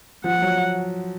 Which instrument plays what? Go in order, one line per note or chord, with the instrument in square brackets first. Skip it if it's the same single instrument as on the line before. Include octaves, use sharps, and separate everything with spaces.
[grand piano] F3 [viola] F#5
[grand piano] F#3